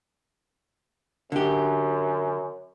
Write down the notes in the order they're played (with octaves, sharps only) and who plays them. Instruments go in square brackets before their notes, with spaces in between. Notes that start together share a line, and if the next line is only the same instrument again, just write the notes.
[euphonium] F#2 [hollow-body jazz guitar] D3 G4